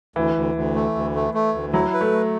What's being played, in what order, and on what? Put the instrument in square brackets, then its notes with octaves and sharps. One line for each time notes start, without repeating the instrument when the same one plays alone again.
[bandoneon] D2 [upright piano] E3
[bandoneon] D2
D2
A3
D2
A3
A3
D2
[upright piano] F#3 [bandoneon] E4
[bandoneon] B4
[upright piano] A3
[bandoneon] A3